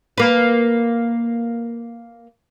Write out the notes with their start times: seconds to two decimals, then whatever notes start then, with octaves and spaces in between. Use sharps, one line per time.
0.18 A#3 B4